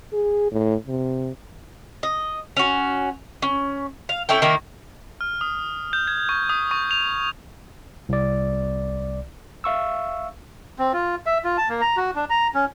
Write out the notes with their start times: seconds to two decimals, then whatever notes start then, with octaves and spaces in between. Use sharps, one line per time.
0.13 G#4
0.52 A2
0.87 C3
2.03 D#5
2.57 C#4 F#4
3.42 C#4
4.09 F5
4.29 C#4 E4 A4 G5
4.42 D#3 A#3 E4
5.21 F6
5.41 D#6
5.93 G6
6.07 G#6
6.29 C#6
6.49 D#6
6.71 C#6
6.91 F7
8.09 C2 D5
9.64 E5 F5 C#6 E6
10.79 C4
10.93 F4
11.26 E5
11.44 F4
11.58 A5
11.69 A#3
11.81 A#5
11.97 F#4
12.16 D4
12.30 A#5
12.55 C#4